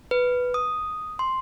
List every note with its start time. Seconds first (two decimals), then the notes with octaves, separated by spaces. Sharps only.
0.11 B4
0.54 D#6
1.19 C6